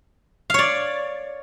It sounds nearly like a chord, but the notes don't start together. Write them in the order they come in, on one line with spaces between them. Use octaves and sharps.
F5 C#5 D5